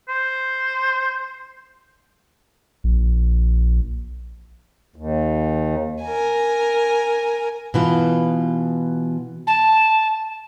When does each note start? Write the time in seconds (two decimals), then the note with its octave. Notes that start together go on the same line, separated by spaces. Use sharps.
0.09 C5
2.84 A#1
4.96 D#2
6.03 A#4 G#5
7.74 B2 E3 F4
9.47 A5